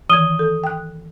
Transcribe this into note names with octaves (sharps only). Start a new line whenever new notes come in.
D#3 E3 D#6 G#6 D#7 G7
A4
G5 F#6